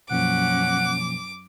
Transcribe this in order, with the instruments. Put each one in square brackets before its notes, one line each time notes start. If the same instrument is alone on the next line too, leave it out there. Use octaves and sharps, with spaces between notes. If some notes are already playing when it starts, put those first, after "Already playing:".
[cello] F#2 C#4 [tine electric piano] B2 F3 A#3 [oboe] F#5 [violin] D6